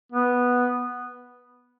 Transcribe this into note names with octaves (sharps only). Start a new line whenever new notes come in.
B3